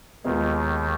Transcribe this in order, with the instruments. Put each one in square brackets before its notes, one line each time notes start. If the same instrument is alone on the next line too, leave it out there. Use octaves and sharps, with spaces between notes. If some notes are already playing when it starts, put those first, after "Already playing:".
[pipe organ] D#2 D#3 [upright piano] B2 G#3 B3 F4 A#4